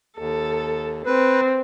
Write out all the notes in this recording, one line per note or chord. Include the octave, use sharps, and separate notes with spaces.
D#2 A4
C4 B4